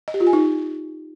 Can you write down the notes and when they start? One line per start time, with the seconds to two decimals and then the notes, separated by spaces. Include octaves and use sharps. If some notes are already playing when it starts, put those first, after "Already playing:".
0.08 D#5
0.14 G4
0.20 F4
0.27 G#5
0.33 D#4